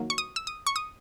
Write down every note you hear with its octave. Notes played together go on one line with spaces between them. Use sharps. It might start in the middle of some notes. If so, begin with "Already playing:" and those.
Already playing: D#3 F#3 A#3
C#6
D#6
E6
D#6
C#6
D#6